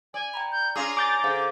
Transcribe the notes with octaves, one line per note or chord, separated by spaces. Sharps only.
D5 G#5
G5 A#5 B5
G6
C#4 F4 G#4 A#5 D6
G#5 D6 G6 A6
D3 G#4 C5 F5